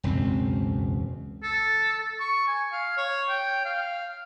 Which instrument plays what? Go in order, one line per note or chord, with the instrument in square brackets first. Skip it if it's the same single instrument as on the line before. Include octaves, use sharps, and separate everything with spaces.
[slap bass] E1 C#2 F#2 C4
[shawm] A4
C#6
G#5
F5
C#5
G5
F5